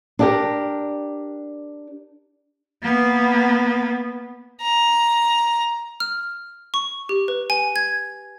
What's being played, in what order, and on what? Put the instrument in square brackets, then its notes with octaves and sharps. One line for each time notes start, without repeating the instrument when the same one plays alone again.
[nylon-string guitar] D4 G4 A#4
[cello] A#3 B3
[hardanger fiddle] A#5
[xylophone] F6
C#6
G4
B4
G#5
G#6